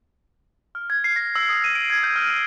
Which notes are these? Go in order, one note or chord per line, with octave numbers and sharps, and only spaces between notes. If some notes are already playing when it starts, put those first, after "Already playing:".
F6
G#6
C7
A#6
E6
D#6
D#7
D7
G#6
G6
F6
D#7